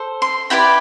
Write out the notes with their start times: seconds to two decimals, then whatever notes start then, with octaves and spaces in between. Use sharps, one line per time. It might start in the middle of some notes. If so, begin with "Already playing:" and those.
Already playing: A4 C5
0.22 C6
0.50 E4 G4 B4 D5 G5